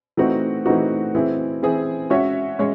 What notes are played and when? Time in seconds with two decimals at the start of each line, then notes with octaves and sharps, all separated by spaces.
0.17 E3 A3 C4 D#4 F#4
0.66 E3 A3 C4 D#4 F#4
1.15 E3 C4 E4 G#4
1.63 E3 C4 E4 G#4
2.10 G#3 C#4 F#4 C#5 E5
2.59 G#3 C#4 C#5